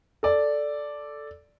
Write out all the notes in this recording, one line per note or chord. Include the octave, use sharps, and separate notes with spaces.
A4 D5